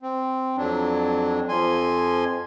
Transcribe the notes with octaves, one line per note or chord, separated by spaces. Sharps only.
C4
F2 F#3 D4
F2 F3 G#5 C6